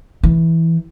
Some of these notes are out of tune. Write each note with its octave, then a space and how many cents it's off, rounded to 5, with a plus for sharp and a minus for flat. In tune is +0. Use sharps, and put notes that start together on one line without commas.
E3 -5